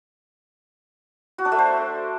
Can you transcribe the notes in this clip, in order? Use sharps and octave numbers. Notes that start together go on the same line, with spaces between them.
F#4
D4
A3
C5